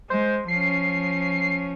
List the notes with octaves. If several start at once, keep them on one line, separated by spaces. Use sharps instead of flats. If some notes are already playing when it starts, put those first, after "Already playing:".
G#3 C5
F3 C#4 C7